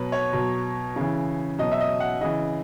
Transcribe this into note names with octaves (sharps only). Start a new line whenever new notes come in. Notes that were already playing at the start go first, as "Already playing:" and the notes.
Already playing: B2 F#3 B4
C#5
B2 F#3
C#3 E3
B2 F#3 D#5
E5
D#5
F#5
C#3 E3 D#5